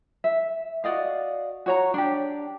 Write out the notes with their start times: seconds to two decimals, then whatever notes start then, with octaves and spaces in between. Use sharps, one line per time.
0.24 E5
0.84 F#4 D5 D#5 F5
1.66 F#4 C#5 A#5
1.94 D4 G4